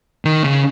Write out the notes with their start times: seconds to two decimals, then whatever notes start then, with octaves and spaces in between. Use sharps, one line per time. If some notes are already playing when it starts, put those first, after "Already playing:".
0.25 D#3
0.44 C#3